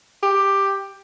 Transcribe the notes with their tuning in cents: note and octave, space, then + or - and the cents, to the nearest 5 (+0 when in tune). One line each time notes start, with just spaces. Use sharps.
G4 +5